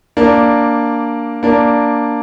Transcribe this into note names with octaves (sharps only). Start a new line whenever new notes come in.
A#3 D4
A#3 D4